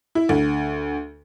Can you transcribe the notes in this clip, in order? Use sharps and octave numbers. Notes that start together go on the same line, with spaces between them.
E4
D2